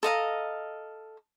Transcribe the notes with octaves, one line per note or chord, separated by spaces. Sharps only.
A4 D#5 F5 A#5